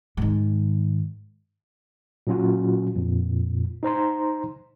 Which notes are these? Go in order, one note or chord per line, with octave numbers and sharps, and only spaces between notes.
G#2 D#3
A#2 F#3 C#4 F4 F#4
F2 A#2
D#4 C5 A#5 C6